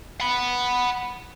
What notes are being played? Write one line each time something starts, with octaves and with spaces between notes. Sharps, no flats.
F#5 B5